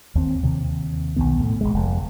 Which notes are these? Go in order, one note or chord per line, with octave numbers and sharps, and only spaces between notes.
D#2 C4
D#2 C3
B1 F2 D#3 B3
A2
A1 G#2 G#3
F1